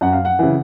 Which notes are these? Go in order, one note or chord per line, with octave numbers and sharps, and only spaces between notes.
F#2 F#5
F5
F#5
C#3 E3